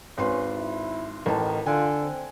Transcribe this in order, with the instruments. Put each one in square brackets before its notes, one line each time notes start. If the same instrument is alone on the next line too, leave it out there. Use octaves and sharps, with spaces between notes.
[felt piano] G#1 B4 C6 [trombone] C#4
[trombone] E4
[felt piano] A1 A5 [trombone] D#3
[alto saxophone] D3 [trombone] F4 [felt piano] G#5
[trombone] C4